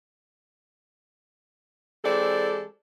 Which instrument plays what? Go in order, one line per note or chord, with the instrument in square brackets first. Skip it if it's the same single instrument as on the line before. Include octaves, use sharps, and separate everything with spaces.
[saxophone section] E3 G#3 C4 G4 A4 D5